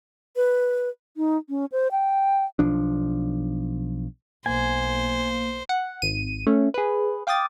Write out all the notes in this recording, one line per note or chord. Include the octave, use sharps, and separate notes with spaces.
B4
D#4
C#4
C5
G5
B1 F3 D4
B1 A#3 C5 G#5
F#5
G#1 D#7
A3 C#4
G#4 B4
F5 G5 D6 D#6 A6